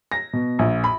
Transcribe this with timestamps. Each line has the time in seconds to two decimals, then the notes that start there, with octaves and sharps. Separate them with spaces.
0.12 A#6
0.33 B2
0.59 A#1
0.84 B5